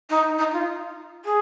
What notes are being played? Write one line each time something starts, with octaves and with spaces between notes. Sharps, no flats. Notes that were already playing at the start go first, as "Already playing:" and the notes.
D#4
D#4
F4
G#4